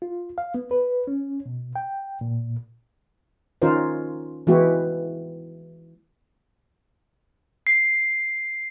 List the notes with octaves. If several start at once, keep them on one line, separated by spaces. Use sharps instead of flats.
F4
F5
B3
B4
C#4
B2
G5
A#2
D#3 C#4 D#4 F4 A#4 C5
E3 G#3 B3 E4 F#4 G4
C7